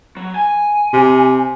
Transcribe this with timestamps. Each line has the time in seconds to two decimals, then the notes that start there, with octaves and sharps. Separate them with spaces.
0.17 F#3
0.35 G#5
0.93 C3